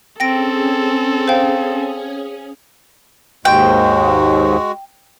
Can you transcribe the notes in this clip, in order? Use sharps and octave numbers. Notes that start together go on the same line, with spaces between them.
C4 C#4 G#4 A4 G5 A#6 D7
C5 F5 G5
D#2 G#2 G#3 F#4 G5